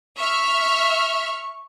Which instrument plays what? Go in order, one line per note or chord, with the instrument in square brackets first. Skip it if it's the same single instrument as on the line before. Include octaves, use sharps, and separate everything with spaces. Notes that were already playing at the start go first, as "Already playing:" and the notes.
[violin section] E5 F6 [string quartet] C#6